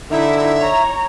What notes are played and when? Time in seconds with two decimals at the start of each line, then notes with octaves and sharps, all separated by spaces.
0.11 D3 D#4 E4 E5
0.59 C#5 A#5